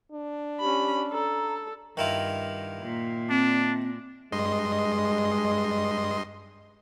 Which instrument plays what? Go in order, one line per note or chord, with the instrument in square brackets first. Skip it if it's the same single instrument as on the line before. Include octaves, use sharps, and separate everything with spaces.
[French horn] D4
[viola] C#4 B5 [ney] G4
[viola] A4 [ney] A#5
[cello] G2 [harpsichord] D#3 E4 F4
[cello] A#2
[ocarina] C4 [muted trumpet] D4
[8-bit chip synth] G2 D#5 C6 [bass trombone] G#3